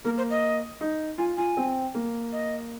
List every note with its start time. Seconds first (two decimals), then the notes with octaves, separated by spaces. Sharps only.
0.05 A#3 A#4
0.18 C5
0.30 D#5
0.81 D#4
1.18 F4 G#5
1.37 F4 G#5
1.57 C4
1.95 A#3
2.32 D#5